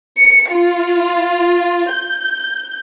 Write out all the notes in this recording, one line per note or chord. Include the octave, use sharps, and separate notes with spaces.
C#7
F4
G6